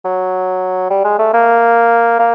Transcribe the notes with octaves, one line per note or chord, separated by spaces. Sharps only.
F#3
G3
G#3
A3
A#3
A#3